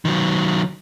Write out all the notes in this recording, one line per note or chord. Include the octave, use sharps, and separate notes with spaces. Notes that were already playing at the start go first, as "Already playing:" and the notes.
D#3 F#3